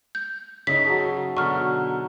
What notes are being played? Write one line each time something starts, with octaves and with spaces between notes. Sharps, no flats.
G6
C#3 D#4 C#5 E5 B6
F#3 G#4 A5
B2 D3 D#4 C#6 F6